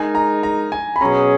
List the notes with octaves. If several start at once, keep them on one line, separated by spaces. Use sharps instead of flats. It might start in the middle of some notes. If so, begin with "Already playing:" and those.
Already playing: G#3 D#4 A#4 G#5
A#5
A#5
G#5
B5
B2 F#3 C#4 G#4 A#5